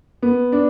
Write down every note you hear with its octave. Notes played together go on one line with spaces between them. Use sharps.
B3
D4